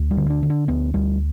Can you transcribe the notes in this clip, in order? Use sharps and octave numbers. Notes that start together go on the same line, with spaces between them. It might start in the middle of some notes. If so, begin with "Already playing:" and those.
Already playing: D2
G3
D3
D4
D3
D4
D2 B3
D2 G3